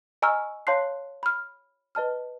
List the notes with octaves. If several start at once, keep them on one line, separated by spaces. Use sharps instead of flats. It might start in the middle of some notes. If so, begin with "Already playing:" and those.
D#5 G#5 A#5 C#6 E6 F6
C#5 F5 A5 C6 F#6 C7
B5 F6
B4 D#5 A5 F6